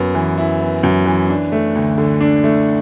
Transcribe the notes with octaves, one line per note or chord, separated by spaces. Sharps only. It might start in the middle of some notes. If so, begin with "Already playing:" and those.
Already playing: F#2 B3
E3
E4
B3
F#2
E3
D4
A3
D2
D3
D4
A3